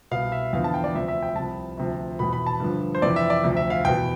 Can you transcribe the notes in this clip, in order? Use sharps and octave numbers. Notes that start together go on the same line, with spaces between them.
C2 B2 F5
E5
E2 D3 F3 F5
A5
G5
D5
D2 C3 F3 E5
E5
G5
C2 C3 F3 A5
D2 C3 F3
E2 B2 B5
B5
A5
G2 D3 F3
C5
F2 C3 E3 D5
E5
D5
D2 C3 F3
E5
F5
E2 B2 G5